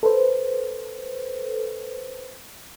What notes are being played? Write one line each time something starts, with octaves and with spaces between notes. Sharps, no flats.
A4 B4 C5